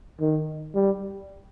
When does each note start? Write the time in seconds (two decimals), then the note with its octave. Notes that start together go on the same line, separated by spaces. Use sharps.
0.21 D#3
0.75 G3